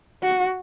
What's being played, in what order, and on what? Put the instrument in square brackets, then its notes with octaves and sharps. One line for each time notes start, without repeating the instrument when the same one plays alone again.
[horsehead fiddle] F#4